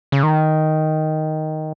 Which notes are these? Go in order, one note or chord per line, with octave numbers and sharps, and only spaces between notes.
C#3
D#3